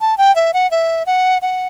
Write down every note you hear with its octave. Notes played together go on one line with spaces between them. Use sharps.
A5
G5
E5
F#5
E5
F#5
F#5